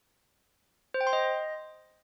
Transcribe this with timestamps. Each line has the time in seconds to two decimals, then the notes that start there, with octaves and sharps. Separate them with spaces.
0.94 C5
1.01 G5
1.07 C6
1.13 D#5